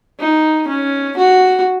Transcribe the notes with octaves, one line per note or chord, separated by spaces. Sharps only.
D#4
C#4
F#4